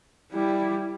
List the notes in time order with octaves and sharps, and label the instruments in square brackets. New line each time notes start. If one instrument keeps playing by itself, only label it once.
[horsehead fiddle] G3 E4